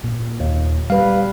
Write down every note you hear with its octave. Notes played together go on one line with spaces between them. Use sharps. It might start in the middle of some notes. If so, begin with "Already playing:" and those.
A#2
D#2
G3 B4 F5